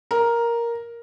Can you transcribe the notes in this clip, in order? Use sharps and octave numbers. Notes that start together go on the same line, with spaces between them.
A#4